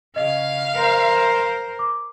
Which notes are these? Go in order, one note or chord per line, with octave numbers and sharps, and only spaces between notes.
C#3 D#5 F5
A#4 C5
D6